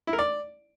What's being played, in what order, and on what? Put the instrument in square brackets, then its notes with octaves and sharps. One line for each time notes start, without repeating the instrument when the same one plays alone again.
[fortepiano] E4
A#4
D5